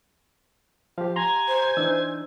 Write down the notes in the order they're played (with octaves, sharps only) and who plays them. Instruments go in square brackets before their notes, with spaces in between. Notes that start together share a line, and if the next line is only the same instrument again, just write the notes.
[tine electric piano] F3 [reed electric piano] G4 F5
[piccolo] G#5 [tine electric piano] A#5 C6
[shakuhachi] C5
[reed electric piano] E3 D4 D#4 [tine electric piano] E6